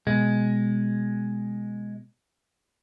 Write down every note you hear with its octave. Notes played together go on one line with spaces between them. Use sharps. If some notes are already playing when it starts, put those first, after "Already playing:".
B2 G#3